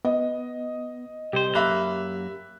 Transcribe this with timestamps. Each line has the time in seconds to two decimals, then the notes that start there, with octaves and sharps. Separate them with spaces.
0.05 B3 D#5
1.33 C2 G4 C5
1.55 F#2 A#3 E5 B5 F#6